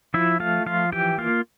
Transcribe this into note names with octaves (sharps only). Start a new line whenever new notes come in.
F3 E4 E5
A3 F4 F5
F3 F4 F5
E3 G4 G5
A#3 F4 F5